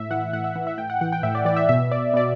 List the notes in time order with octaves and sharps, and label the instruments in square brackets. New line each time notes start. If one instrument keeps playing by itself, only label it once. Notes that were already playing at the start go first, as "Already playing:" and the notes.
Already playing: [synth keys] A2 E5
E3 F#5
A2 F#5
E5
E3
E5
A2 G5
F#5
E3 F#5
G5
A2 E5
D5
E3 D5
E5
B2 E5
D5
B2 D5